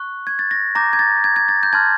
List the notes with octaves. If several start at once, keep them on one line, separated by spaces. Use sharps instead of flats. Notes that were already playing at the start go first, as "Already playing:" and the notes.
Already playing: C#6 F#6
G#6
A6
A#6
A#5 D6 G6 A#6
G#6
A6
G#6
G#6
A6
G6
A5 C6 F6 G#6